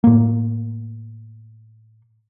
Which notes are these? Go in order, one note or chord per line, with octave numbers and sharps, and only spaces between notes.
A2 A#3